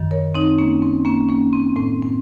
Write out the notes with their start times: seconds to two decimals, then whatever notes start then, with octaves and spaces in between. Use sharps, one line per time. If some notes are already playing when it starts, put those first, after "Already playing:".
Already playing: F#2 D#3
0.11 A#4 C#5
0.35 C4 D#4
0.58 A#3 C#4
0.82 C4
1.05 A#3 C#4
1.29 A#3 C#4
1.53 C4
1.76 A2 C4
2.02 C4